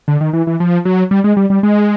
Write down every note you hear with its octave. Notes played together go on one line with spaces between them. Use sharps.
D3
D#3
E3
E3
F3
F#3
G3
G#3
G3
G3
G#3